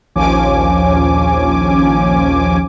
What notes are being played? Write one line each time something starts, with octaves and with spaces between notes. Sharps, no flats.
A#1 D#2 F3 C#4 G#5 D6